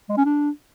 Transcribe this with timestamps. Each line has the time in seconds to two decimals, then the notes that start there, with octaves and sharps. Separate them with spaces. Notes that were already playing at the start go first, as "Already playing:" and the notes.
0.09 G#3
0.17 C#4
0.25 D4